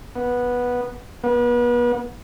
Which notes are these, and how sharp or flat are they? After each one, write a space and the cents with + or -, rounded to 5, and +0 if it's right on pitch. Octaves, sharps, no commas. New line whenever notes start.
B3 -10
B3 -35